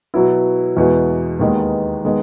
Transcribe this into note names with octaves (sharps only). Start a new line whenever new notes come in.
B2 F#3 B3 E4
E2 B2 G#3 B3
D#2 D#3 G#3 B3 D#4
D#3 G#3 B3